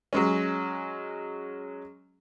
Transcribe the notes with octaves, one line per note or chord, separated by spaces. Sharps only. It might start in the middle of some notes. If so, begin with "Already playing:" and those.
F#3 G#3 C#4